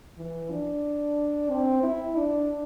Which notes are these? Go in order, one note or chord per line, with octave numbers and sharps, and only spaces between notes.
E3
D4
C4
E4
D4